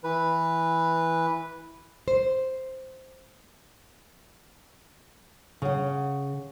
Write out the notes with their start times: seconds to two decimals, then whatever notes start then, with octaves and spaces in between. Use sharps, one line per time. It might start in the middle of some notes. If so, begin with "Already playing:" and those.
0.04 E3 B4
2.08 C5
5.62 C#3 F#5